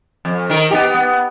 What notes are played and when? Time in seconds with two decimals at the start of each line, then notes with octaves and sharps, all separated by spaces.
0.25 F2
0.50 D#3 A#4
0.71 B3 D#4 G4
0.95 B3